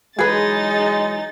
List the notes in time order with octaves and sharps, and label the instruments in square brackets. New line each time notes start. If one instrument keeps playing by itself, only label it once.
[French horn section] E3 F#3 G#3 [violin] D#4 A6 [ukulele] G#4 B4